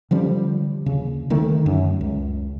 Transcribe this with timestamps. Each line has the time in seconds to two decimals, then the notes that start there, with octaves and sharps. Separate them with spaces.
0.11 D3 F3 G3 C#4
0.86 D#2 C#3
1.30 D3 D#3 A3
1.66 F#2
2.01 C#2